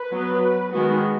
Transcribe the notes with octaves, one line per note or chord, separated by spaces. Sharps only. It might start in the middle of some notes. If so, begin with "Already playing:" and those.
Already playing: B4
F#3 B3
D#3 G#3 B3 F#4